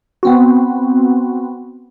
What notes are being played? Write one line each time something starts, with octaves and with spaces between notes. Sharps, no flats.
B3 C4 F#4